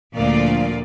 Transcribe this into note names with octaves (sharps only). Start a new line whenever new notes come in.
D2 A#2 F3 A#3 F4 D5